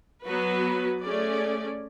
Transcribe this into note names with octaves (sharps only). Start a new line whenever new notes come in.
F#3 B3 F#4 B4
A3 C#4 G#4 D5